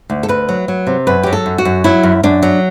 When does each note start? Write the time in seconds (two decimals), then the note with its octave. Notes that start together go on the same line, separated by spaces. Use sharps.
0.10 D2
0.23 A4
0.28 D2 B4
0.49 F#3
0.68 F#3
0.87 C3
1.07 F#2 B4
1.23 F#3 G4
1.33 A4
1.46 F#2
1.58 F#4
1.65 F#2
1.84 F#3 E4
2.03 F#2
2.23 F#2 D4
2.43 F#3